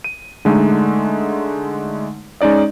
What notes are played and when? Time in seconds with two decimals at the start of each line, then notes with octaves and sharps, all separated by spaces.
0.04 D#7
0.45 D3 G#3 A3 D#4
2.41 G#3 C#4 D#4 D5 D#5